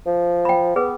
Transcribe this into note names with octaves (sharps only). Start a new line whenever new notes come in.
F3
G5 B5
B3 G#4 B4